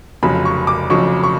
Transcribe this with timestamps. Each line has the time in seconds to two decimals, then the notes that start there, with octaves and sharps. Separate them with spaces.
0.23 F1 F2 C#3 F#3 B5
0.45 C#6
0.67 D6
0.90 F1 F2 C#3 F#3 C#6
1.23 C#6